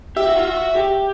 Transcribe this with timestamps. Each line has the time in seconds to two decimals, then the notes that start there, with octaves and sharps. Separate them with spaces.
0.16 G4 E5
0.27 F#4
0.37 F4
0.47 F#4
0.76 G4